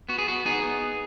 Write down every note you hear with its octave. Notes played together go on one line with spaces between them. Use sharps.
B3 F#4
G#4
B3 F#4
B3 D#4 G#4
B3